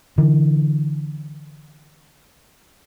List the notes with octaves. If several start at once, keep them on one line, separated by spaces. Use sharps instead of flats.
D3 E3